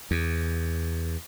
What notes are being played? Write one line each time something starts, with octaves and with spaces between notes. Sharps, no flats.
E2